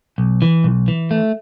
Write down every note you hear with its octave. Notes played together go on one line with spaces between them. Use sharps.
B1
E3
B1
E3
A3